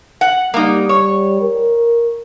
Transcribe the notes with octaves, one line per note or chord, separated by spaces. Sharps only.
F#5
G3 A#3 D#4
C#5
A#4